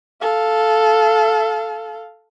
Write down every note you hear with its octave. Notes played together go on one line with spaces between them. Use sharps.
A4 F5